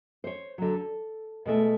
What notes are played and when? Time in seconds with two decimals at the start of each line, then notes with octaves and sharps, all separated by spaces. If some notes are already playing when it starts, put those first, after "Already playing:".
0.24 C5 C#5
0.58 D3 F#3
0.74 A4
1.45 B2 G#3 A3 E4